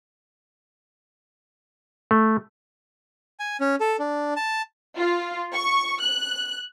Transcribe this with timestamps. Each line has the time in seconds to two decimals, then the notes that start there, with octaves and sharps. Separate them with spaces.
2.11 A3
3.40 G#5
3.60 C#4
3.80 A4
3.99 D4
4.36 A5
4.97 F4
5.54 C#6
6.01 F#6